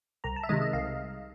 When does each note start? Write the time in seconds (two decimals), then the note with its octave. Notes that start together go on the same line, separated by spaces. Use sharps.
0.24 C2 A#5
0.36 A5
0.44 E5
0.49 C3 D#3 G#3 D#5
0.62 D#5
0.73 C2 F5